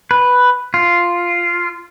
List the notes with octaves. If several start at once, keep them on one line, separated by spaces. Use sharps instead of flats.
B4
F4